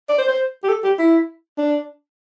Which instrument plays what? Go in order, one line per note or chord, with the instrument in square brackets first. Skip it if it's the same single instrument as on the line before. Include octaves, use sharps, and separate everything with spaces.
[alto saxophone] D5
C5
C5
G4
A4
G4
E4
D4